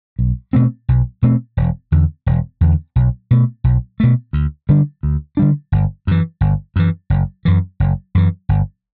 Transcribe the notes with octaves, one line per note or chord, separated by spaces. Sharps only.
B1
B2 A3 C4
B1
B2 A3 C4
E1
E2 D3
E1
E2 D3
B1
B2 A3
B1
B2 A3
D2
D3 G3 D4
D2
D3 G3 D4
G1
F#2 E3
G1
F#2 E3
F#1
F#2 E3
F#1
F#2 E3
G1